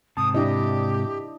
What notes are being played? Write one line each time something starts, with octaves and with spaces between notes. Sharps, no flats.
G#2 C3 A5 D#6
D4 E4 G4 D#5